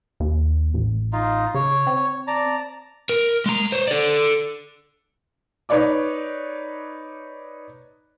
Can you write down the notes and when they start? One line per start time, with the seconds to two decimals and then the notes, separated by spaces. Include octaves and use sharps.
0.20 D#2
0.74 A1
1.13 D#4 F4
1.54 C#3 C#5
1.87 C4
2.27 D5 A5 A#5
3.09 A#4
3.46 G#3 A#5
3.72 C5 C#5
3.88 A4 D5
5.69 D#4 B4 C#5 D5 D6